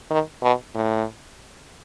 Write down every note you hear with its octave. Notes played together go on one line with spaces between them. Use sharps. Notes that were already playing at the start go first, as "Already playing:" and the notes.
D#3
B2
A2